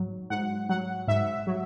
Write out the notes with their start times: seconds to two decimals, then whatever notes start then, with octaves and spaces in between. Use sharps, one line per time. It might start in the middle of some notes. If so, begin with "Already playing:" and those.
Already playing: G#2 F#3
0.30 G#2 F#5
0.69 F#3 F#5
1.08 G#2 E5
1.47 F#3